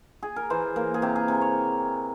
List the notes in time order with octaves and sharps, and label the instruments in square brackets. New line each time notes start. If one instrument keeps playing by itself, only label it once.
[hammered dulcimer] G#4
A#4
E3 C5
A#3 A#4
G#4
C3 G4
G#4
C3
C#5